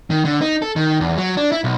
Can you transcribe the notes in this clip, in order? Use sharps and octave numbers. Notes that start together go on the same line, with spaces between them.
D#3
D3
D#4
A4
D#3
E2
F#3
D4
E4
B1